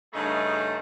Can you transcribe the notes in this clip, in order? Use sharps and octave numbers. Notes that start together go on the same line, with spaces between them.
G2 C#3 A3 D#4 G#4 A#5